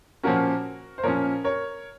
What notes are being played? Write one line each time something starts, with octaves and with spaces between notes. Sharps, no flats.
A#2 F3 A#3 C#4 F#4 A#4
C5
A#2 F3 A#3 C#4 A#4 C#5
A#4 C#5